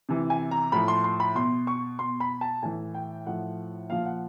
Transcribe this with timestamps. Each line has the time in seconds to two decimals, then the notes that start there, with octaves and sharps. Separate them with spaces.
0.09 C3 E3
0.30 G#5
0.51 A#5
0.72 A2 F3 B5
0.88 C6
1.04 C6
1.20 B5
1.35 B2 C6
1.67 C#6
1.99 B2 C6
2.20 B5
2.41 A5
2.63 A2 E3 G#5
2.94 G5
3.26 A2 F3 F#5
3.90 A#2 F3 F5
4.05 F#5